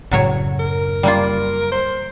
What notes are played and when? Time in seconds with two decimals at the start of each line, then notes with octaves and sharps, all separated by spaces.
0.11 F#2 A2 C#3 F#3 C#5
0.60 A#4
1.03 G3 A#3 F4
1.72 C5